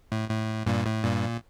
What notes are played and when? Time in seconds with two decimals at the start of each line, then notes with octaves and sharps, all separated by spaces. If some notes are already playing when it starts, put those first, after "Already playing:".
0.12 A2
0.30 A2
0.66 G2 A#2
0.86 A2
1.04 G2 A#2